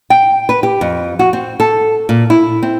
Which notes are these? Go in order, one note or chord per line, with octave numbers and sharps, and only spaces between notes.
G5
B4
G4
F2
F#4
C4
A4
A#2
E4
C4